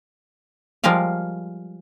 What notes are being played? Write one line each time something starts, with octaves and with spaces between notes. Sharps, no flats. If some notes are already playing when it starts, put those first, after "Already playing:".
F3 G3 G#3 A#4 F5